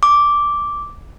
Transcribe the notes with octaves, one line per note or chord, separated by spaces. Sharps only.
D6